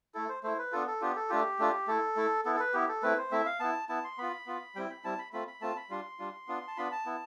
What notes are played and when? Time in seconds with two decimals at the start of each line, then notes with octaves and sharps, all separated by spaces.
0.14 A3 E4 A4
0.29 C5
0.43 A3 E4 C5
0.58 B4
0.72 B3 D4 F4 A4
0.87 A4
1.02 B3 D4 F4 G4
1.16 A4
1.30 A3 D4 F4 G4
1.59 A3 D4 F4
1.88 A3 E4 A4
2.16 A3 E4
2.45 B3 E4 A4
2.56 A4
2.60 B4
2.74 B3 E4 G4
2.88 A4
3.03 A3 C4 E4 B4
3.17 C5
3.31 A3 C4 E4 E5
3.46 F5
3.60 B3 E4 A5
3.89 B3 E4 A5
4.04 C6
4.18 B3 F4 B5
4.47 B3 F4
4.75 G3 C4 E4 G5
4.90 B5
5.04 G3 C4 E4 A5
5.19 B5
5.33 A3 C4 F4 B5
5.47 B5
5.61 A3 C4 F4 A5
5.77 B5
5.90 G3 D4 F4 C6
6.19 G3 D4 F4
6.48 B3 D4 F4
6.68 A5
6.77 B3 D4 F4 B5
6.92 A5
7.06 B3 E4